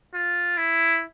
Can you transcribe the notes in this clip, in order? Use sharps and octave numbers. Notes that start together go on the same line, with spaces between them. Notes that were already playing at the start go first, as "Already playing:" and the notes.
F4
E4